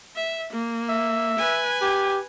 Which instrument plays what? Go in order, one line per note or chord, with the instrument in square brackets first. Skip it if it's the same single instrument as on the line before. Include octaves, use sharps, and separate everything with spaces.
[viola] E5
A#3
[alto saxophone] E5
[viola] B4 G#5
[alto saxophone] G4